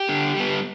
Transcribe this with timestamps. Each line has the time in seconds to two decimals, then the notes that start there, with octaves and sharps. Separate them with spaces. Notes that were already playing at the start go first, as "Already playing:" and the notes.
Already playing: G4
0.09 D3
0.36 G3 B3